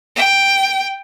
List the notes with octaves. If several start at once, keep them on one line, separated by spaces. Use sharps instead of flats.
G5